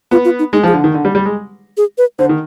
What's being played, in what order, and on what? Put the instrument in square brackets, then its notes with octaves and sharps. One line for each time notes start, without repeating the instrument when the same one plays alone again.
[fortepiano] B3 [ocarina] F4
[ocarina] F4
D#4
[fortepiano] G#3 [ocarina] D#4
[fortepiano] F3
[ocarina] G#4
[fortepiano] D3
D#3
D3
G3
G3
G#3
[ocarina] G#4
B4
[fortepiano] D3 [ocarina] C5
[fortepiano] D#3